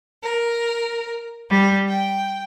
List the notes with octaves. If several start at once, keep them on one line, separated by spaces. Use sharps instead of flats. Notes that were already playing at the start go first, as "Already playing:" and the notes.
A#4
G3
G5